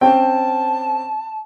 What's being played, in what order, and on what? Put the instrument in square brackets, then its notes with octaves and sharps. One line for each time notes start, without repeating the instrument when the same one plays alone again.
[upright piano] C4 C#4 G5 [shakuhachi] A5